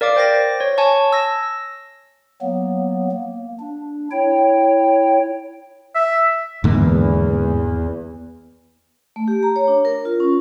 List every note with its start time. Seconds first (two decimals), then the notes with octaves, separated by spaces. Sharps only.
0.01 A#4 D5 F5 D6
0.16 C5 G5 A6 A#6
0.60 C#5
0.78 C#5 G#5 A5 C#6
1.13 E6 A#6
2.42 F#3 A#3 B3
3.12 A#3
3.60 D4
4.11 E4 C#5 G5
5.95 E5
6.64 E2 G#2 D3 A#3
9.16 A3
9.28 G4
9.43 A#5
9.56 C#5
9.68 D4
9.85 A#4
10.05 F4
10.20 C#4